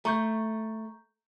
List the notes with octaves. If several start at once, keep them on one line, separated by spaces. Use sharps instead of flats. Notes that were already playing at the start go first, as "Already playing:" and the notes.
A3 A#5 C#6 G6